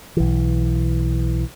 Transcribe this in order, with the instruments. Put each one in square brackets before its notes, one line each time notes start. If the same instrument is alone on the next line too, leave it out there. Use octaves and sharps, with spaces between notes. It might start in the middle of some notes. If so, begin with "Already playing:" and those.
[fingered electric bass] B1 E3